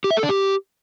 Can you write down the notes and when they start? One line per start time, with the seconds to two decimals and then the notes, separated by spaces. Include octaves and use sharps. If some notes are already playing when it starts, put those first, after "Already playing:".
0.04 G4
0.11 E5
0.17 A4
0.23 D4
0.29 G4